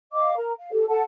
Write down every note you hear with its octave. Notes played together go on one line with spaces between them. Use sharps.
D#5 F5 D6
A#4 A#5
F5
G4 A4
A4 F#5 A5